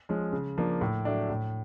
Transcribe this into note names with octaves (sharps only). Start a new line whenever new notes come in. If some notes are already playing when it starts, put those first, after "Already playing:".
F3 G#3 C#4
C#3
F3 A#3 D4
A2
F#3 A3 D4
A2